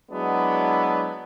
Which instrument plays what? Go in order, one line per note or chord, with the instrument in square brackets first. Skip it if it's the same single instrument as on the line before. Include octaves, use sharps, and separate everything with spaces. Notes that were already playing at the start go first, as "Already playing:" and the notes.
[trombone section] F#3 G#3 B3 D4 E4